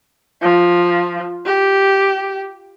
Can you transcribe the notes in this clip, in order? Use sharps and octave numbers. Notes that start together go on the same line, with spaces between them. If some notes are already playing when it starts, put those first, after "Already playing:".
F3
G4